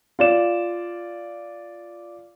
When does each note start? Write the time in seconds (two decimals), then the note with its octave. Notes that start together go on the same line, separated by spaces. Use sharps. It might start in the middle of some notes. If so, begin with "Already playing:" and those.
0.19 F4 D5 E7